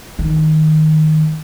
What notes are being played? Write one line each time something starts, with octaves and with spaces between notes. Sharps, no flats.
D#3